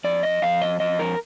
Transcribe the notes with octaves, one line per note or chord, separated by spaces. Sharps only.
F2 D5
D#5
F2 F5
D#5
F2 D#5
A#4